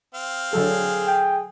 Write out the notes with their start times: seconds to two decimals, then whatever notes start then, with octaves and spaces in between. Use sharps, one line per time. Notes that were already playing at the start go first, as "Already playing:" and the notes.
0.15 C4 F5
0.53 D3 F#3 G#4 A4
1.08 G5